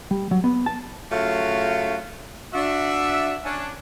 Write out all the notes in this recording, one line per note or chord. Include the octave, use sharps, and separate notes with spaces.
G3
F#3
B3
A5
C#3 F#3 A3 F4 F#4 F5
D4 F#4 E5
C#4 D4